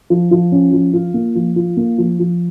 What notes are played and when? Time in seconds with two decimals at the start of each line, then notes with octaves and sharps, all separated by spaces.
0.10 F3
0.31 F3
0.52 C#4
0.73 F3
0.93 F4
1.14 A#3
1.35 F3
1.56 F4
1.77 A#3
1.98 F3
2.20 F3